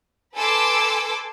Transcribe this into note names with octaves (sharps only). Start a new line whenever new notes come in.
A4 B4 G#5 C6 D6 E6